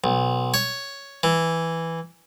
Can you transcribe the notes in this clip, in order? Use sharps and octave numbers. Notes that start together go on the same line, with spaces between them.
B1
C#5
E3